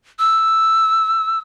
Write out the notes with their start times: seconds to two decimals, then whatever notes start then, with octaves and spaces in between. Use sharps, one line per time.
0.19 E6